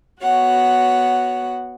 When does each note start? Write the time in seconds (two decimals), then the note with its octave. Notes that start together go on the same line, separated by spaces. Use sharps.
0.21 B3 F#4 C#5 F#5